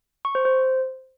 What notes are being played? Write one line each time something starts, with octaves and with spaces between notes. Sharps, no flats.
C#6
C5
C5